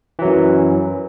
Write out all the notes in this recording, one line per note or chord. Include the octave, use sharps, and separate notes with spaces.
F#2 E3 F#3